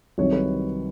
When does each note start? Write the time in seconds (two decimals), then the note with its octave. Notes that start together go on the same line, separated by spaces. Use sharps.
0.18 C2 C3 D#3 F#3 C#5
0.33 B4